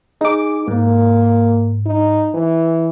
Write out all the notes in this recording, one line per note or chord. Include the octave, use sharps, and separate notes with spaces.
D#4 G#4 D6
G#2 A#3
D#4
E3